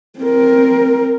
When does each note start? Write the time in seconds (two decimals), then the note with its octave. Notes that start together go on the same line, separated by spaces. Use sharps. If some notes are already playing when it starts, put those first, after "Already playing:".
0.20 C4 A#4